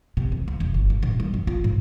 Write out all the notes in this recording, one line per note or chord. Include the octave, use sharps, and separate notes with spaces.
C3
E2
C#2
E1
G1
G#2
D#1
G3
F#2
F4
G#2